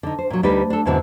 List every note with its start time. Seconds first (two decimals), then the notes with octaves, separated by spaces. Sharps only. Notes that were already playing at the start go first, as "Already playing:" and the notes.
0.03 D3 D#4
0.19 C5
0.30 A#2 F#3
0.43 D2 G3 D4 D#4 B4
0.70 D4 A4
0.85 E2 G#2 B2 D3 C4 E4